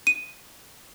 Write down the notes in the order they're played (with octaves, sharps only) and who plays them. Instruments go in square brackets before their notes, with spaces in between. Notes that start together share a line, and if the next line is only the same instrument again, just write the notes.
[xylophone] D#7